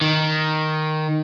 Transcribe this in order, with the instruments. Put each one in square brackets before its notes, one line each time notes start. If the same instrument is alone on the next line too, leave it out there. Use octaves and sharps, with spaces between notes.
[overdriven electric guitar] D#3